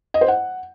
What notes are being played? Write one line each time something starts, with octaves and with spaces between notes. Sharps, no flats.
D#5
C5
F#5